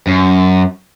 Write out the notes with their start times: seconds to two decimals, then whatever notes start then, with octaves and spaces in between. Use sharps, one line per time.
0.07 F#2